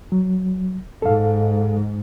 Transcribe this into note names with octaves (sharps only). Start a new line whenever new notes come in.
F#3
G#2 A4 F5